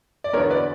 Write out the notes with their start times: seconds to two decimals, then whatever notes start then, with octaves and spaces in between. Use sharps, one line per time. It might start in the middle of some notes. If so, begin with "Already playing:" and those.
0.24 D5
0.33 E2 D3 F#3 B3 A#4 C#5
0.50 B4 D5